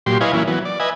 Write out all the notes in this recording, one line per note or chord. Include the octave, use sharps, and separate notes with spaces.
A#2 F#3 G4 C6
E4 B4 C#5 D#5 F5 G#5
E3 F#3 A#3 C#4 E4
E3 F#3 B3
D5
B4 D#5 E5 G#5